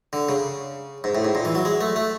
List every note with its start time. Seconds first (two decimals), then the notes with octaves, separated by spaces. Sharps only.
0.13 D3
0.29 C#3
1.04 G#2
1.15 A2
1.25 G#2
1.35 A#2
1.45 E3
1.55 F#3
1.65 G#3
1.81 A3
1.96 A3